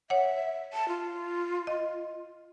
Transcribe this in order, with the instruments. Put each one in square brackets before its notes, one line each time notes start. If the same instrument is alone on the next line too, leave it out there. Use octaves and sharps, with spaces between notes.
[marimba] C#5 F#5 [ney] E5
[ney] A5
F4
[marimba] D#5